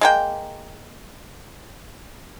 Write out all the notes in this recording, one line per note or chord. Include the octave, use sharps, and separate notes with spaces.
G#3 A#3 G5